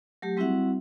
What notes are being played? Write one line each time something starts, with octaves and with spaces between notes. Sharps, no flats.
F#3 A3 G4
G3 C4 E4 F#4 E5 F#5